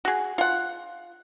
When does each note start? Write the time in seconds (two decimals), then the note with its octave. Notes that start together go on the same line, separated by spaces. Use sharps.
0.05 F#4 G#4
0.38 F4 F#5